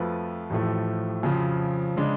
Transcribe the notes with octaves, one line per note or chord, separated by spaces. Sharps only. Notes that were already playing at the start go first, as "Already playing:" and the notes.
Already playing: F2 F3 A3 F4 B4
A1 A2 F3 A3
F2 C#3 F3
C#3 G#3 D4